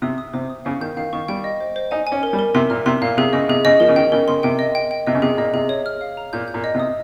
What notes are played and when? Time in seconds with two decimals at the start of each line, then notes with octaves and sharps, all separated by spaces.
0.02 C3 D#6
0.18 D#6
0.34 C3 C5
0.50 D#6
0.65 C#3 F5
0.81 D#3 G6
0.97 D#3 F5
1.13 D#3 C#6
1.28 G3 G5
1.44 D#5
1.60 C5
1.76 C5
1.91 D#4 G#5
2.07 G#5
2.12 C#4
2.23 A#4
2.33 G3
2.39 A#4
2.55 C3 C6
2.70 A#2 F6
2.86 C3 C6
3.02 A#2 F5
3.18 C3 G#4
3.33 C#3 D#5
3.49 C3 G#4
3.65 C#3 D#5
3.80 F3 A#4
3.89 C#3
3.96 D#3 G5
4.12 C#3 A#4
4.28 C#3 C6
4.43 C3 G5
4.59 D#5
4.75 G5
4.91 G5
5.07 C3 D#5
5.15 C#3
5.22 C3 G#4
5.37 A#2 D#5
5.53 C3 G#4
5.69 C#5
5.86 F6
6.01 F5
6.17 A#5
6.33 A#2 G6
6.48 G6
6.54 A#2
6.64 D#5
6.75 C3
6.80 D#6